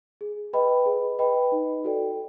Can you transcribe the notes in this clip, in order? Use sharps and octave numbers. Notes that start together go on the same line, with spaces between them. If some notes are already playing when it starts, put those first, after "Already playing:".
G#4
B4 D#5 G5 B5
G#4
B4 D#5 G5 B5
D#4
F#4 A4 D5 G5